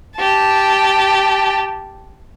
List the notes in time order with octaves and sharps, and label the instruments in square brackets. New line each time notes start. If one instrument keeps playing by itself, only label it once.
[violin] G4 A5